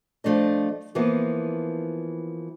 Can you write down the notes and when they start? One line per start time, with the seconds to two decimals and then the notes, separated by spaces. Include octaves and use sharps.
0.24 F3 A3 D4 D#5
0.95 E3 F3 A#3 B3